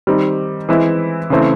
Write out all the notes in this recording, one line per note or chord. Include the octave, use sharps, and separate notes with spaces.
D#3 G3 C4 D#4
E3 G#3 C4 E4
C#3 E3 A3 C4 E4